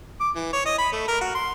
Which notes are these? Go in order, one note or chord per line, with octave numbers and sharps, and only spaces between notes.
D6
E3
C#5
D#5
B5
A3
A#4
F#4
C6